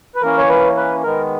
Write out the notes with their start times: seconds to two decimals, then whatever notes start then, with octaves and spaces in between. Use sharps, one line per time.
0.15 B4
0.21 E3 A#3 C#4 A#4
0.38 C#5
0.49 B4
0.77 B4
1.03 D#3 G#3 B3 A#4